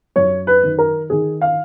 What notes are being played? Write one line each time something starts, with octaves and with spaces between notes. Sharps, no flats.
F#2 C#5
B4
D#3
A#4
D#3 G#4
F5